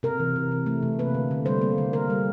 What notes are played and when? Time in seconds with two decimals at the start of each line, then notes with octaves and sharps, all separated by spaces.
0.03 C3 A#4
0.20 E3
0.36 C3
0.51 E3
0.66 A3
0.83 C3
0.99 A#3 B4
1.15 D3
1.31 D3
1.46 G3 C5
1.61 A#3
1.78 D3
1.93 A#3 A#4
2.10 G3